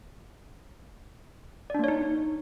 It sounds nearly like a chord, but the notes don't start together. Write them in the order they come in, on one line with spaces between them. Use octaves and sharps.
D5 D4 A#3 C#5 D#4